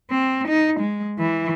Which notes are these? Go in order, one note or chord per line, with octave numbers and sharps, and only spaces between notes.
C4
D#4
G#3
E3